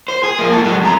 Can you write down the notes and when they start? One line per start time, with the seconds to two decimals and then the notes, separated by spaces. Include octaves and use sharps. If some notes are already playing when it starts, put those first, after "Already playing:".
0.08 C5
0.23 G#4
0.39 F3 A#3
0.52 G#2 A4
0.64 F#3 G#3
0.82 F2 A#5